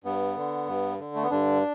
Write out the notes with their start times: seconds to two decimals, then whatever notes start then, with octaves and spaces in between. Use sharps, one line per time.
0.04 G2 B3
0.36 D3
0.68 G2
1.00 D3
1.15 A3
1.23 B3
1.31 G2 D3 D4